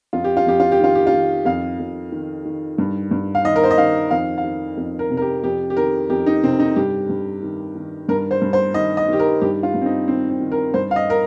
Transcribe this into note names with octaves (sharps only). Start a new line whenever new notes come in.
F2 F4
G4
F4
F2 G4
F4
G4
D#3 F4
G4
F4
D#3
F2 F5
F2
D#3
D#3
G2
G2
F5
D#3 D#5
A#4
C5
D#5
D#3 F5
F2 F5
F5
D#3
F2
A#4
C3
A#4
G4
F2 G4
G4
D#3 A#4
F2 G4
D#4
C3 C4
D#4
G2 G4
G2
D#3
D#3
G2 A#4
C5
G2
C5
D#3 D#5
D#5
D#3 G4
A#4
G2 G4
F4
G2
C4
D#4
D#3 C4
C4
D#3
A#4
G2 C5
F5
D#5
A#4